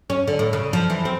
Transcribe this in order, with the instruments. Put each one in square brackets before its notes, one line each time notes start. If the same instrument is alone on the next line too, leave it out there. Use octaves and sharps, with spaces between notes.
[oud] C#4
D3
A2
C#3
F3
E3
C4